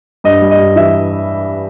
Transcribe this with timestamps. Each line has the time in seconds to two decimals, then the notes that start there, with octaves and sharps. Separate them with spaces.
0.24 G2 D#5
0.42 G3
0.51 D#5
0.59 G2
0.76 E3 E5